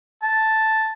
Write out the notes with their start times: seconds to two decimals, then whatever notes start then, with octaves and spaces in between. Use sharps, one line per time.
0.23 A5